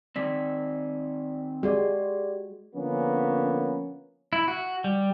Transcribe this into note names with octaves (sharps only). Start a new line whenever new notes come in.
D#3 C4 D5 B6
G#3 F#4 G4 D5
D3 F3 A#3 B3 C#4
E4
F#4
G3